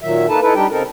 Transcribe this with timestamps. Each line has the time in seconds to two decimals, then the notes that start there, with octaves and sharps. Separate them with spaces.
0.02 A#2 D#3 F#3 E5
0.28 A#3 D#4 A4 B4 A5
0.41 D#4 E4 A4 B4
0.55 G3 D4 D#4 G4 G5
0.71 C#3 C4 D#4 A4 A#4